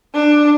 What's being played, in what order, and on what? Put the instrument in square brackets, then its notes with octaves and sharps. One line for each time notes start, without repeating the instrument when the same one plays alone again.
[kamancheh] D4